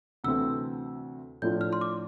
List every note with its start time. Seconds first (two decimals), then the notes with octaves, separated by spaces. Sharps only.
0.24 D2 C3 E3 A3 C4 E6
1.42 A2 F3 A3 D4 F4 G6
1.61 F6
1.73 C6
1.81 D6